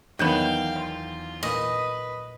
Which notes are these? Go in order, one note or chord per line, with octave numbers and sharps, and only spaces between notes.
E2 D#3 F#3 B3 F5 G5 G6 E7
F4
A#2 B4 D#5